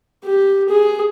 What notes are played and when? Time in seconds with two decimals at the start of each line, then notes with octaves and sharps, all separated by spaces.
0.24 G4
0.69 G#4